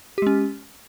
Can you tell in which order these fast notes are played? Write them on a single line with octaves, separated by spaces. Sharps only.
G4 G#3 C#4